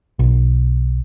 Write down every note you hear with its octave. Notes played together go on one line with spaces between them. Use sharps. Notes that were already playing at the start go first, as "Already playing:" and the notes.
B1